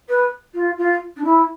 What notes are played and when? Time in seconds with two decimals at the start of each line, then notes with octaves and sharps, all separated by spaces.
0.09 B4
0.55 F4
0.78 F4
1.17 D4
1.25 E4